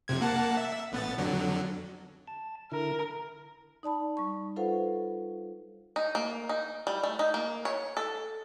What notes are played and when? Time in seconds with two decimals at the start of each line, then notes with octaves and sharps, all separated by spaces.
0.08 F2 C3 G#6
0.21 A#3 F#5 A5
0.57 E5
0.92 A1 B3 A6
1.18 F2 D3 F#3
2.28 A5
2.72 D3 E4 A#4
3.83 D#4 D5 A5 B5
4.17 G3 C#6
4.56 F4 A4 B4 C5 F5 F#5
5.96 D#4
6.15 A#3
6.49 D#4
6.87 G3
7.03 A3
7.19 D#4
7.34 A#3
7.65 C#5
7.97 A4